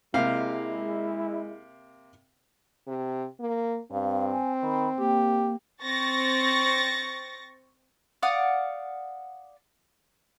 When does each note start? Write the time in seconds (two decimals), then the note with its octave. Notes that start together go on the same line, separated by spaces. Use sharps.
0.14 C3 G#3 A#3 E4 F5
2.87 C3
3.40 A#3
3.91 G2 C4 F5
4.32 G#5
4.63 D#3 B5
4.99 A#3 G4
5.83 C4 C#6 A6 A#6
8.23 D5 F5 F#5 D#6